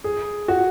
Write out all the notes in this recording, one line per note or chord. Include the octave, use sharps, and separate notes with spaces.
G#4
F#4